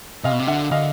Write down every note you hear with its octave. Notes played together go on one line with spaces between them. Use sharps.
C3 D#5 F5
B2
C3
D3 E5 F#5
D3 D#5 F5